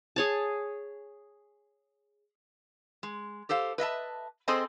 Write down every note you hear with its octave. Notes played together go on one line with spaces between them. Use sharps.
G#4 C#5 A5
G#3
G4 A4 C5 F5
B4 D#5 E5 A5
C4 G#4 A4 C5 D#5 G#5